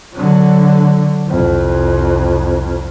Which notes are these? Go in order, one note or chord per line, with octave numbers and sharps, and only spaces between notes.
D3 F#3
C2 F2